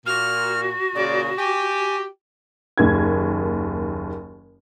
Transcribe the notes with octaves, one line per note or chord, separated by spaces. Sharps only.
A#2 F#4 F6
A#2 C#3 D5
G4 G#5
F#1 D#2 G#6